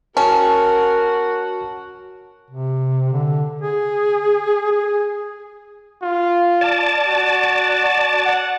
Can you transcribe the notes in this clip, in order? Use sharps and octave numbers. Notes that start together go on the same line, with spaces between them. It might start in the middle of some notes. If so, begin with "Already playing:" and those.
C#4 F#4 A#4 A5
C3
D3
G#4
G#4
F4
D5 A5
F#4
F#5